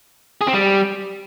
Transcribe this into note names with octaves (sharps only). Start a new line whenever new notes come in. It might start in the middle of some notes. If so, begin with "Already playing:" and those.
G#4
C4
G3